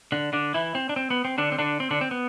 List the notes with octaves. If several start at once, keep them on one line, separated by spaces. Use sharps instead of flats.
D3 D4
D3 D4
E3 E4
C4
D4
C4
B3
C4
D3 D4
C4
D3 D4
C4
D3 D4
C4
B3